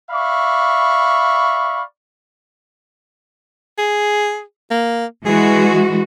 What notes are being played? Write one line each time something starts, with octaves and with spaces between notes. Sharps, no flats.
D5 E5 F5 B5 C#6
G#4
A#3
E3 G#3 F#4 G#4